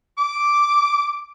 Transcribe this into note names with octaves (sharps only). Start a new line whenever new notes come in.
D6